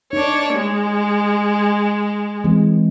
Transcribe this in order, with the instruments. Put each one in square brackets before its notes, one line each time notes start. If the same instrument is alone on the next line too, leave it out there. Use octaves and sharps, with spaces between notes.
[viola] D4 C#5 [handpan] D#4
[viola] G#3
[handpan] E3 G#3 C4